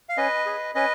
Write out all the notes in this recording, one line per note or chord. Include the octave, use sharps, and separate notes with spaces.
F5
C#4 B4 D#5
G#4
C#4 B4 D#5